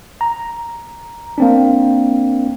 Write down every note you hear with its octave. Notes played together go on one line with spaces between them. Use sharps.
A#5
A#3 C4 D4